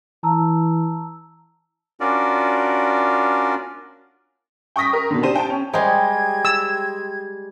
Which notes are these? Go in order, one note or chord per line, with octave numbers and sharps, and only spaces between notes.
E3 A5 A#5 E6
C#4 D4 F4 F#4 A#4 D5
G5 C#6 D#6 A#6 B6
A#4
B2 D3
D4 G4 C5 D#7
G5 A5
C#4
G3 G#3 C5 D#5 G5 G#6
E6